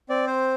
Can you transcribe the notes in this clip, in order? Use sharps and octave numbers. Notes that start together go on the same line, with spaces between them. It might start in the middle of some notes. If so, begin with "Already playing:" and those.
C4 D5
C5